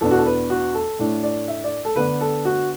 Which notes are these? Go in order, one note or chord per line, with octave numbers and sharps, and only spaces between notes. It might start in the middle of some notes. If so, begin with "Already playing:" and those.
E2 B2 B3 D4 A4
F#4
A4
B4
F#4
A4
A2 A3 D4
D5
E5
D5
A4
D3 B3 D4 B4
A4
F#4